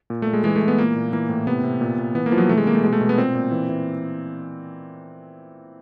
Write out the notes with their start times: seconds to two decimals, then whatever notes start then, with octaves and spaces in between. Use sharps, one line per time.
0.10 A#2
0.22 A#2 A3
0.33 G#3
0.44 E3 G#3
0.56 A3
0.61 E3
0.68 B3
0.78 A#2 A#3
0.96 A#2
1.12 E3 A#3
1.29 A2
1.47 C3 B3
1.63 C3
1.81 A#2
1.98 A#2
2.15 E3 B3
2.26 A#3
2.32 E3 F3
2.38 F#3
2.49 C3 A3
2.57 G#3
2.66 E3 A#3
2.75 A3
2.83 B2 G#3
2.93 A3
3.01 B2
3.09 B3
3.18 A#2 C4
3.35 A#2
3.52 E3
3.69 E3